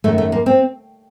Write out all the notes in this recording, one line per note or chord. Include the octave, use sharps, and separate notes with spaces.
F#2 D#3 A3
A3
A#3
C4